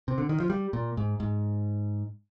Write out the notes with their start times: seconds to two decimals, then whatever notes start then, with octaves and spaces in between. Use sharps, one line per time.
0.08 C3
0.18 D3
0.29 D#3
0.40 F3
0.50 G3
0.73 A#2
0.97 G#2
1.20 G#2